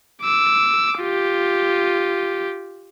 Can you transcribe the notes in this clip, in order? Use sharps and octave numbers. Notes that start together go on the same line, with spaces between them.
D6 E6
F4 G4